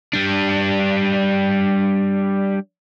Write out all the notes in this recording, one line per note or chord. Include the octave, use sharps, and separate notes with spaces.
G3 D4